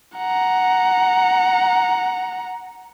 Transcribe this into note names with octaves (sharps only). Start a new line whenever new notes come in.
F#5 A#5